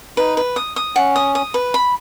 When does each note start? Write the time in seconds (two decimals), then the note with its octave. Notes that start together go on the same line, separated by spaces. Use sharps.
0.17 D#4 B4
0.37 B4
0.56 D#6
0.76 D#6
0.95 C#4 F#5
1.16 D#6
1.35 D#6
1.54 B4
1.74 B5